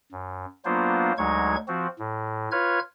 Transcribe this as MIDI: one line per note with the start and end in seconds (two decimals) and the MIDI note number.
0.12 0.46 42
0.65 1.12 54
0.65 1.12 58
0.65 1.12 59
0.65 1.12 62
0.65 1.12 65
0.65 1.12 72
1.18 1.56 38
1.18 1.56 54
1.18 1.56 56
1.18 1.56 63
1.18 1.56 85
1.18 1.56 92
1.68 1.87 53
1.68 1.87 60
1.68 1.87 66
1.99 2.49 45
2.52 2.79 65
2.52 2.79 71
2.52 2.79 73
2.52 2.79 89
2.52 2.79 92